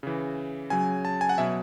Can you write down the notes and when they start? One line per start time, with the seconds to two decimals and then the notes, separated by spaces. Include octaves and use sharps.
0.03 C#3 E3
0.70 C#3 F#3 G#5
1.05 A5
1.21 G#5
1.29 F#5
1.38 B2 F#3 E5